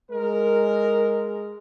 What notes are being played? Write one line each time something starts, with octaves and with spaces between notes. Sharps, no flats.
G#3 A#4